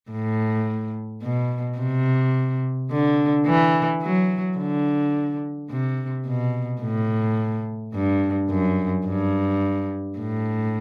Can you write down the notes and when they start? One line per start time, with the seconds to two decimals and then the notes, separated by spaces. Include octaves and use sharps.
0.11 A2
1.23 B2
1.78 C3
2.91 D3
3.46 E3
4.02 F#3
4.58 D3
5.70 C3
6.26 B2
6.82 A2
7.94 G2
8.50 F#2
9.07 G2
10.18 A2